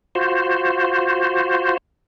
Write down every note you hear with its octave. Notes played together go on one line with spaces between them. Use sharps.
F4 F#4 C5